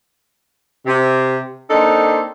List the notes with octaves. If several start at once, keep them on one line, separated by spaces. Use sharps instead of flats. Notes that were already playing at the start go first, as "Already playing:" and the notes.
C3
A#3 C4 D4 D#4 A4